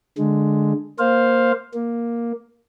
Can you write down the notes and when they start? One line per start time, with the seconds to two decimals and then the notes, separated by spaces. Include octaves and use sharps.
0.18 D3 G#3
0.99 A#3 C5 F5
1.74 A#3